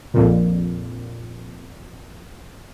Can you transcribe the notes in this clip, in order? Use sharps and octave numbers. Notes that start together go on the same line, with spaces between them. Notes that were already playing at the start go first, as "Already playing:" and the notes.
A#1 F2 A#2